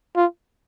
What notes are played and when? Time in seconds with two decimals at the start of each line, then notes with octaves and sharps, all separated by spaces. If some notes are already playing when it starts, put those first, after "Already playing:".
0.16 F4